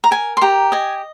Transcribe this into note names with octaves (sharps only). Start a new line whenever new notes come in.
A#5
A#4 G#5
C6
G4 A#5
D#5 G#5